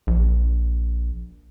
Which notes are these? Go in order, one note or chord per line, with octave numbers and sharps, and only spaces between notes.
A#1